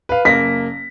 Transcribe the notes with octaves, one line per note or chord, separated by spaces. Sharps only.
B4 F5
F#1 A#3 A#6 B6